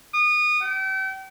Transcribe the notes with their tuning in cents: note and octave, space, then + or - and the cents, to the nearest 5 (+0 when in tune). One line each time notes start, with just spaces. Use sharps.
D#6 -25
G5 -35